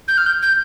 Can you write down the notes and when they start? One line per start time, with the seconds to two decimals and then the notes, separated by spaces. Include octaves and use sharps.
0.08 G6
0.18 F6
0.26 G6
0.42 G6